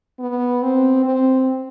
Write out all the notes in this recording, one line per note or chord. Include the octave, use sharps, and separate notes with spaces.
B3
C4
C4